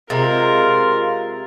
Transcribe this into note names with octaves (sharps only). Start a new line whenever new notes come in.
C3 G#3 F4 A#4 A#5 A6